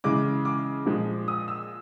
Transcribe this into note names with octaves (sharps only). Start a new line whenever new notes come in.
C#3 E3 G#3 D6
D6
A#2 F3 G#3
D#6
E6